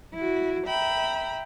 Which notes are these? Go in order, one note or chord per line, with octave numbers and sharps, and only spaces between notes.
E4 F#4
E5 G5 A#5 B5